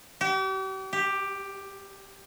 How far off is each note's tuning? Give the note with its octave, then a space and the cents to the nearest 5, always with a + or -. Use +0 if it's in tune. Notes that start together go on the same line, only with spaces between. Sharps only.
G4 -40
G4 +10